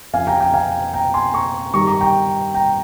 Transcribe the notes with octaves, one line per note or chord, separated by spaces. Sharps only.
F2 C#3 F3 F5 G#5
G5 A#5
G5 A#5
F5 G#5
G5 A#5
G#5 C6
A#5 C#6
G2 D#3 G3 A#5 C#6
A#5 C#6
G5 A#5
G5 A#5